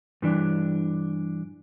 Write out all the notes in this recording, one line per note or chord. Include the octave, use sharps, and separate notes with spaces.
G2 E3 D4